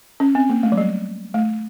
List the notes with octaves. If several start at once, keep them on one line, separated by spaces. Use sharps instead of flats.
C#4
C4
A#3
A3
F#3
G3
A3